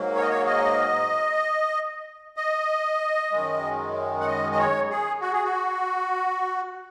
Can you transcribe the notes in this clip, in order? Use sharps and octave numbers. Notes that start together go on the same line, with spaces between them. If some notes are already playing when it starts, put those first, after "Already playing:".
Already playing: G#2 F#3 A#3
C#5
D#5
C#5
D#5
D#5
F#2 D#3 G#3
F#5
D#5
D#5
C#5
G#4
F#4
G#4
F#4